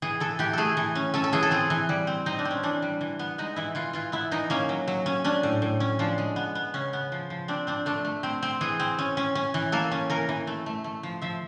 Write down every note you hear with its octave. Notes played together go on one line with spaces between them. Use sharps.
E3 G#4
E3 A4
E3 G4
A3 G#4 A4
E3
C#4
C#4 A4
A4
E3 G#4
A4
C4 G#4
E3
G3
C4
C4 D#4
D4
C4
C#4
E3 D4
G3
E3
B3
G#3 D#4
E3 E4
E3 F4
E3 F4
B3 E4
E3 D#4
A#3 C#4
F#3
F#3
C#4
C#4 D4
A2
A2
C#4
F3 D4
G#3
B3
B3
C#3 C#4
B3
F3
F3
C4 D4
C4 D4
A3 D4
A3
C4
C4
E3 G#4
C4
C#4
C#4
C#4
E3
A#3 A4
C#4
E3 A#4
E3
A3
A3
A3
F3
F3 E5